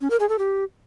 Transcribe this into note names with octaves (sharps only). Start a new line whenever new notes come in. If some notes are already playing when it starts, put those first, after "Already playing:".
C#4
A#4
G#4
A4
G4